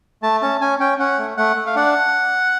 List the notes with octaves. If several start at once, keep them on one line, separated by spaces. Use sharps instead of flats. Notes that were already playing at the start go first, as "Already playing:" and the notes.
A3 A5
C#4 A5
C#4 G#5
C#4 G5
C#4 F#5
A3
A3 F#5
A3
F5
D4 F#5